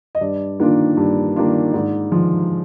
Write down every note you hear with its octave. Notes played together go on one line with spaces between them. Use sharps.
D#5
G2 D5
D#3 A#3 D4 F4
G2
D#3 A#3 D4 F4
G#2 D5
F3 G#3